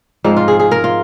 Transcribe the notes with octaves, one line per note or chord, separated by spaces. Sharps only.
G#2 F3 G#3 C4 D#4
F4
G#4
G#4
A#4
F4